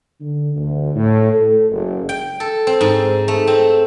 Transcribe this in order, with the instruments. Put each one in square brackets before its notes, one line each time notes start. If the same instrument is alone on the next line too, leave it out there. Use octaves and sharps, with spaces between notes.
[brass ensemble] D3
D2
A2
A4
F#1
[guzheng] G5
A4
C4
G#2
A3
C4